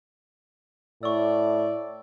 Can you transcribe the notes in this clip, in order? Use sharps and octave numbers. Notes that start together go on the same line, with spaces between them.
A2 D5 C#6 E6